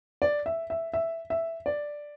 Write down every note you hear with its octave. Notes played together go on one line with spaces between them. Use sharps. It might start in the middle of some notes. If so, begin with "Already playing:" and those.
D5
E5
E5
E5
E5
D5